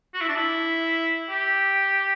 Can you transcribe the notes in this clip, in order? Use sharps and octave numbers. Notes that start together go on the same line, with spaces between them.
F#4
E4
D4
E4
G4